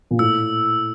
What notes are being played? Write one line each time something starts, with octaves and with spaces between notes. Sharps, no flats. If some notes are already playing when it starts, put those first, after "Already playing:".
A#2
A2 E6